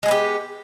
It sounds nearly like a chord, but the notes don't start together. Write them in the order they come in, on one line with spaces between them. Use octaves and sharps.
G#3 G#4 B3 G4